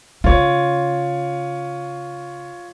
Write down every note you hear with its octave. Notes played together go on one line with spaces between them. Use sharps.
C#3 F4 C#5